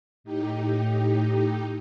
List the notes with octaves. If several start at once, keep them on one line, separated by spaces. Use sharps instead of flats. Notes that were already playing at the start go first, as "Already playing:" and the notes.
A2 D#4 G4